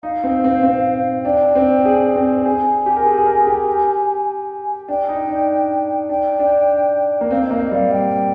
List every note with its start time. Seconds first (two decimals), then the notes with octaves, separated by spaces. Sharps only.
0.03 D#4 F5
0.24 C4
0.44 C4
0.63 C4
1.24 D4 G5
1.55 C4
1.85 G#4
2.16 C4
2.46 G#4 G#5
2.86 G4
2.96 A#4
3.06 G#4
3.17 G#4
3.26 A#4
3.40 G#4
3.47 G4
4.88 D4 G5
5.09 D#4
5.29 D4
6.09 D4 G5
6.39 D4
7.21 A#3
7.31 C4 F5
7.45 D#5
7.51 A#3
7.54 F5
7.61 D#5
7.71 G3 F5
7.91 G5